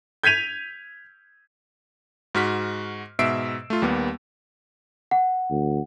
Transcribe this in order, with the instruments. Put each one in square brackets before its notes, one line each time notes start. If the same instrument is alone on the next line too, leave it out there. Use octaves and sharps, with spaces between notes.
[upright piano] G6 G#6 B6 D#7 F7
[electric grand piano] G#2 F#4 F6 B6
G#2 B2 E5 E6 C7 D7
A3 F4
D#2 G3 A#3 B3
[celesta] F#5
[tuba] D2